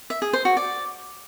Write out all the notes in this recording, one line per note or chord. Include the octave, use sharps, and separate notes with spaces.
E5
G#4
C5
F#4
D5